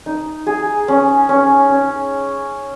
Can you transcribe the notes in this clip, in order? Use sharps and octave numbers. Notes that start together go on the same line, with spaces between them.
D#4
G#4
C#4
C#4
C#4